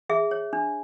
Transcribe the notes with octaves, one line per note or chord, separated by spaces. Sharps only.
G#4 E5
C#5
D4